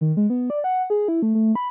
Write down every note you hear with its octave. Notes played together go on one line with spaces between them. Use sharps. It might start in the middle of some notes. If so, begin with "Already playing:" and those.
D#3
G#3
B3
D5
F#5
G#4
E4
A3
A3
B5